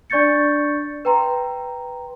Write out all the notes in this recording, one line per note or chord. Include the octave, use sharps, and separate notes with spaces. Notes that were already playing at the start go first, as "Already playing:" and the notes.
D4 D5 C#6 G6 A6 C#7
B4 G5 A#5 C6